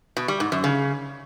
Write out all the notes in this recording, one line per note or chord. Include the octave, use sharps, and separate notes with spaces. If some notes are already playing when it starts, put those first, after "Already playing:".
B2
G3
G#2
F#2
C#3